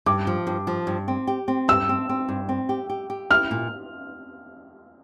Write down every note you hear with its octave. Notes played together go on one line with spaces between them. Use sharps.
G2 D6
F3
G2
F3
G2
C4
G4
C4
G2 E6
C4
C4
G2
C4
G4
G4
G4
E4 F6
A#2